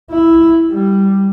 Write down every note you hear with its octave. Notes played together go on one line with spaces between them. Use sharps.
E4
G3